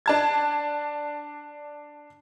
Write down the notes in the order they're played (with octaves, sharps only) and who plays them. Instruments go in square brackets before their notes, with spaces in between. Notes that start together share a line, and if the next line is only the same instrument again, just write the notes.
[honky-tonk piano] D4 A5 G#6